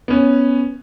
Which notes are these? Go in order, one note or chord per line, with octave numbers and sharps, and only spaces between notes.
B3 C#4